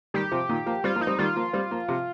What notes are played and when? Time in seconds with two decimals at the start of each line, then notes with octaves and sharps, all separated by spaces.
0.14 D#3 G3 G4
0.32 C3 F3
0.49 A#2 D#3
0.66 F3 A#3
0.84 G3 C4 F4
0.95 F3 A#3
1.01 D#4
1.07 G3 C4
1.19 D#3 G3 F4
1.36 F3 A#3
1.53 G3 C4
1.71 F3 A#3
1.88 C3 F3